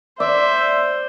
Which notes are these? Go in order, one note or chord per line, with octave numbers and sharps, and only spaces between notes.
C5 D5 E5